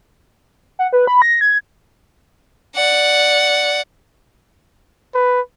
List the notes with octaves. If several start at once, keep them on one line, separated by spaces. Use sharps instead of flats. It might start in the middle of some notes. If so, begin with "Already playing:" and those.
F#5
B4
B5
A#6
G#6
D5 F#5
B4